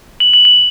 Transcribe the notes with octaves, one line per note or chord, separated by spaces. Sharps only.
F#7
F#7
F#7